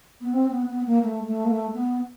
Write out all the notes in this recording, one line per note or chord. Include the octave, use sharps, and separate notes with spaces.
B3
C4
B3
B3
A#3
A3
A3
A#3
A3
B3